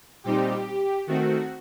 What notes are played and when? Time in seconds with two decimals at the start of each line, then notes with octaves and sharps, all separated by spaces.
0.24 A#2 G3 C4 D#4 G4
1.07 D#3 A3 C4 F#4